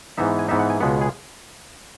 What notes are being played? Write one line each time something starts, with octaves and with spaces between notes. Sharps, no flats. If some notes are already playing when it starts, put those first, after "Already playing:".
G#2 E3 B3 D#4 E5
G#5
G#2 E3 B3 D#4 E5
F#5
G#5
C#2 B2 G#3 B3 F#5
G#4